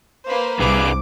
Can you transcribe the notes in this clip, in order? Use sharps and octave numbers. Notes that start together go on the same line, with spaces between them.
A#3 B4 C5
C2 G2 G#4 B4 D6